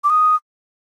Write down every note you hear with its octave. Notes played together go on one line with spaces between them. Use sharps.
D6
D#6